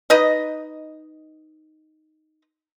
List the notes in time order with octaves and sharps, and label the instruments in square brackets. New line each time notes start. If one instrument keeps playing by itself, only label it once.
[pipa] D#4 B4 D#5